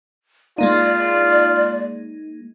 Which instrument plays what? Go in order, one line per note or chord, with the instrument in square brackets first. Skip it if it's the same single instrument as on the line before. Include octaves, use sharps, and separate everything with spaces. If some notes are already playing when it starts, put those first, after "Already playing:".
[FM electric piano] G#3 A#3 D#4 [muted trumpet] F4 [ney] D5